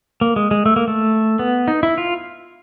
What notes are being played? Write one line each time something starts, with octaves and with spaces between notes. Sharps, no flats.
A#3
G#3
G#3
A3
A#3
A3
B3
D#4
E4
F4